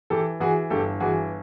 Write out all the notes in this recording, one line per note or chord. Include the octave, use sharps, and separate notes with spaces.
E3 G4 A4
E3 F#4 G#4
G1 G4 A4
E3 F#4 G#4